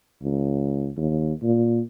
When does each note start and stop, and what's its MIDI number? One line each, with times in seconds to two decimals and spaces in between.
0.22 0.89 37
0.97 1.33 39
1.43 1.80 46